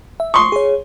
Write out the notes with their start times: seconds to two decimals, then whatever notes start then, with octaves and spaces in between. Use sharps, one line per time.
0.20 E5
0.34 C6 C#6 D#6
0.52 G#4 C#5